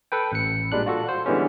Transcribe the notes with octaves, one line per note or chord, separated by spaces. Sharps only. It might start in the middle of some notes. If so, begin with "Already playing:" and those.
A4 B4 G5
A1 C#7
A#2 G3 G#3 D4 F#6
F4 F#4 A4
C5
D3 E3 G3 G#3 B3 C#4